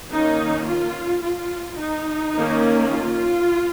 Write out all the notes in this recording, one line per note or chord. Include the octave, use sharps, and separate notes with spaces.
D#3 A#3 C#4 D#4
F4
F4
D#4
D#3 A#3 C#4
F4